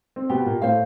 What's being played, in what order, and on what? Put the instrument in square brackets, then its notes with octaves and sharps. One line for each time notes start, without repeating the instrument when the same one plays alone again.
[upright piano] C4
[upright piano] B2 B3 [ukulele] G4
[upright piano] A#2 A#3
[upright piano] A2 A3 [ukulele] C5 F5